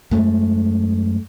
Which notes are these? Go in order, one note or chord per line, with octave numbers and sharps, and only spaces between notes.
F#2 G#3 A3